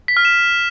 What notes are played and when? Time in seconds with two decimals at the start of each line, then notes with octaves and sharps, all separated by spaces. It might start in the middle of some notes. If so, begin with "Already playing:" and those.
0.08 B6
0.17 F6
0.25 E7